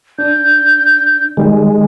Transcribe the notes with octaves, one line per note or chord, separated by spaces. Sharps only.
D4 G6
D#3 G3 G#3